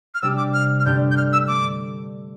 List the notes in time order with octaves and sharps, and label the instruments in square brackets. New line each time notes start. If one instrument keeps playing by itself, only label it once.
[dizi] F6
[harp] C3 G3 D4 G4 [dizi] E6
[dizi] D6
F6
F6
[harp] G2 D3 A3 D4 G4 [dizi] G6
[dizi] G6
F6
E6
[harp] A3 [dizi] D6